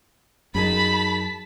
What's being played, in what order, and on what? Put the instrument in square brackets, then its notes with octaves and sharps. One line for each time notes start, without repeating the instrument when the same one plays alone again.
[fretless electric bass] F#2 [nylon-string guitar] D#4 G#4 A#4 [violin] A5 B6 [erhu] B5